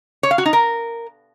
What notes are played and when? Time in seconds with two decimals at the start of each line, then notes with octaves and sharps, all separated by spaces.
0.23 C#5
0.31 F5
0.38 F#4
0.46 D#4
0.53 A#4